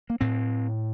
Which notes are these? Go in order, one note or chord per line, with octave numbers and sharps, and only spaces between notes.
A#3
A2 C4